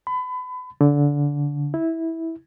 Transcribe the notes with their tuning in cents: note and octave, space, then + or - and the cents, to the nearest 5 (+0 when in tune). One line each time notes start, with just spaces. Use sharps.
B5 +30
D3 -20
E4 -15